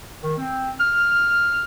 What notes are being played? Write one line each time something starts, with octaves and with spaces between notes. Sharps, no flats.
D#3
C4
F6